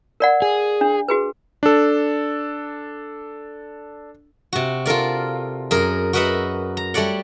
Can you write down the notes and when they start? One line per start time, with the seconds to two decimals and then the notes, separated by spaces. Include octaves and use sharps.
0.20 A#4 D5 F#5
0.42 G#4
0.81 D4
1.08 F#4 G#4 B4
1.63 D4 A4
4.53 C3 F#4
4.86 F4 A4 A#4 D5
5.71 F#2 G#4 A#4
6.13 F#4 A#4 B4 D#5 E5 F#5
6.77 A#5
6.94 G3 A3 C#5 D5 F#5